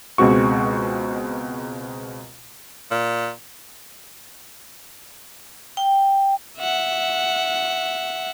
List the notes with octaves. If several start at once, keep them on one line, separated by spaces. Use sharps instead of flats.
C#2 B2 G#3 C4 F#4 C#6
A#2
G5
E5 F#5